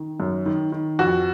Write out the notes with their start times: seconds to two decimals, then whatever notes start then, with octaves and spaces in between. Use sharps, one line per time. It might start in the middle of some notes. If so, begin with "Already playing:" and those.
Already playing: D#3
0.20 F#2
0.46 D#3
0.72 D#3
0.99 F2 F#4